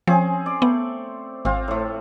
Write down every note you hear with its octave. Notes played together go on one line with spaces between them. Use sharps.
F3 C4 C#4 G#4
D5
A3 B3
G#1 C4 F4
A2 A3